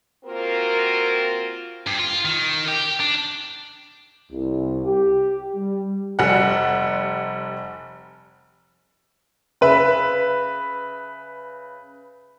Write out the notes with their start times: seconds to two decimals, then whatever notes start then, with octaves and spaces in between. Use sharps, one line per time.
0.25 A#3 C4 F4 F#4 A#4
1.87 G2
1.99 F4
2.25 D#3
2.68 G4
3.00 D4
4.32 C2
4.86 G4
5.56 G3
6.19 F1 G3 F#5
9.61 C#3 B4 E5